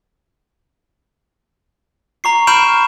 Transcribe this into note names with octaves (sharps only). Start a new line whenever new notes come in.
A#5 C#6 C7
B5 C#6 F6 G6 D7 E7